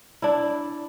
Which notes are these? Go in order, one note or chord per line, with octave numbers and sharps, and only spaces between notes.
D4 E4